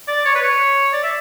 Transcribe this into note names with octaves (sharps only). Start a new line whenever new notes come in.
D5
C#5
B4
C#5
D5
E5